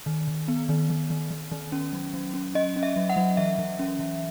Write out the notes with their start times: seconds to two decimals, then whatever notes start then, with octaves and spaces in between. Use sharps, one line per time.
0.06 D#3
0.28 D#3
0.48 B3
0.69 D#3
0.90 D#3
1.10 D#3
1.31 D#3
1.52 D#3
1.72 C#4
1.93 F#3
2.14 F#3
2.34 C#4
2.55 C#4 D#5
2.76 C#4
2.83 E5
2.96 F#3
3.09 F#5
3.16 F#3
3.37 E3 E5
3.58 E3
3.79 C#4
3.99 E3